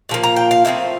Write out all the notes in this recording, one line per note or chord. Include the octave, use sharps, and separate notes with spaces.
A#2 F3 A#3
A#5
G5
F5
A2 F3 C4 E5